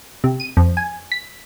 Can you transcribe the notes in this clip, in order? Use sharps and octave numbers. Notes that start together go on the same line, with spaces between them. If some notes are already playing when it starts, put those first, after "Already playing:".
C3
D#7
F2
G#5
B6